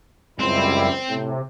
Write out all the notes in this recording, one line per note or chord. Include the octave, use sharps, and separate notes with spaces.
C#2 F#2 G3 C4 E4
A2 C3